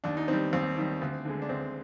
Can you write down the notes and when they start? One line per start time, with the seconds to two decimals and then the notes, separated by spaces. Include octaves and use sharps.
0.04 D#2 D4
0.17 D#4
0.28 D#3 G3 C4
0.53 D#2 C4
0.77 D#3 G3
1.01 D2
1.25 D3 G#3
1.42 D4
1.49 D2 C4